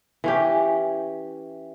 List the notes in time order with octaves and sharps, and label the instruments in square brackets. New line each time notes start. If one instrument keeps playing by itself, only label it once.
[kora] E3 C#4 G4